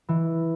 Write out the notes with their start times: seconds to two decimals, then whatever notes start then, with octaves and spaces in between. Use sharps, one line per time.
0.09 E3